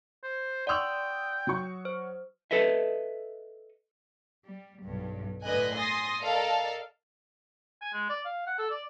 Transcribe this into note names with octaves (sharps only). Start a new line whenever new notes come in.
C5
D5 F#5 G5 C6 C#6 D#6 E6
F#3 F#4 C#6
C5
A4 B4 D#5 E5
G3
B1 G2
A2 D3 B4 D#5 G#5 F#6
G#5 C6 D#6 A6 A#6
A4 A#4 D5 D#5 F5 A5
G#5
G#3
D5
F5
F#5
A4
D5